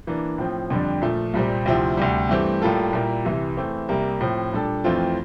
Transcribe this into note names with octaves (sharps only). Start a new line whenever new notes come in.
E3 A#3 D4
A2 F3 C4
F2 D3 G3 D4
A#2 F3 A3
C2 A#2 G3 C4
D2 C3 F3 C4 E4
D2 C3 G3
G2 E3 A3 C4 G4
A2 G3 A#3 F4 A4
A#2 G3 A#3 E4
C2 C3 E3
E2 E3 A3 C4
C2 C3 G3 A#3
A2 F3 C4
A#2 G3 D4 A4
F2 E3 A3 C4 F4